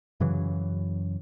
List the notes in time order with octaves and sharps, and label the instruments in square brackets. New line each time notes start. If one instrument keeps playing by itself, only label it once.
[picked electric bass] F#2 C#3 E3 F#3